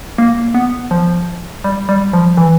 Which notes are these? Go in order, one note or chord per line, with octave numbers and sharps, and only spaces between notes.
A#3
B3
F3
G3
G3
F3
E3